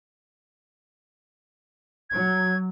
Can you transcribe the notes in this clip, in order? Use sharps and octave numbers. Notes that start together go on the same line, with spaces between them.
F#3 G#6